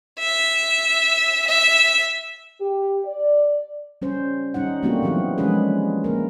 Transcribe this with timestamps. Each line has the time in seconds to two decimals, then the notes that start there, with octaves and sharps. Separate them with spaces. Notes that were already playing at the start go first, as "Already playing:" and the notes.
0.19 E5
1.47 E5
2.61 G4
3.06 D5
4.02 G3 C#4 C5
4.54 G3 C#4 D#4 F#5
4.83 G3 A3 A#3 C4 D4 F#4
5.02 E3 F#3 G3 B3 C4 D4
5.38 F3 G#3 C#4 D4 G#4 B4
6.04 A#3 A#4